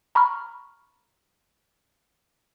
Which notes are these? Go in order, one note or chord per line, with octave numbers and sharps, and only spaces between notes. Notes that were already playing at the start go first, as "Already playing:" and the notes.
A#5 B5 C#6 F6